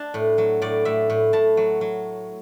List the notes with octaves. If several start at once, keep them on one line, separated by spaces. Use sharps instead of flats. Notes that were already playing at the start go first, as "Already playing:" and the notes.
Already playing: D4 A5
A2
F#3
A2 D5
A2 E5
A2
A2 A5
F#3
F#3